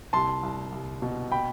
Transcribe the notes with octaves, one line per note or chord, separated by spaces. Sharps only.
C2 A5 C6
C2
C2
B2
G5 B5